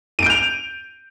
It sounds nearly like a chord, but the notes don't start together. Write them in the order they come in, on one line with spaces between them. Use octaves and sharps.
D#7 D7 G6 F7